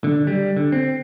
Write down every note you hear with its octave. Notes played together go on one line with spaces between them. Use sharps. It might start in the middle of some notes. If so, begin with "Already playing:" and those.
D3
G3
D3
C4